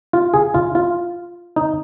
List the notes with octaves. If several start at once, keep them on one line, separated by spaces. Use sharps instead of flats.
F4
G#4
F4
F4
D#4